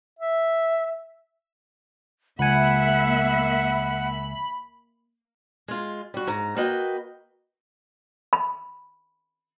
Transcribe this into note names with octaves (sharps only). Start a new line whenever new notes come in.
E5
C#2 A#3 E5 F#5 G#5 B5
G#3 F4
G3 F#4
G#2 A#5
A#3 F#4 B4 D#5 G5
B5